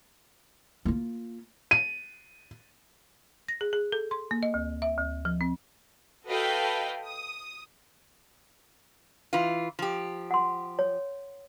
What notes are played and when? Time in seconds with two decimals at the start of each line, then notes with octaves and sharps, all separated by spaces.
0.85 A#3 F4
1.71 D#7
3.48 A#6
3.61 G#4
3.73 G#4
3.92 A4
4.11 C6
4.31 A#3
4.43 D#5
4.54 D2
4.82 E5
4.98 D2
5.25 F3
5.41 C4
6.26 F#4 A4 B4 D#5 F5 G5
7.05 D#6
9.33 E3 F4
9.79 F3 G4
10.31 F#5 C6
10.79 C#5